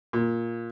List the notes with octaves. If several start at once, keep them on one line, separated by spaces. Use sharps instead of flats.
A#2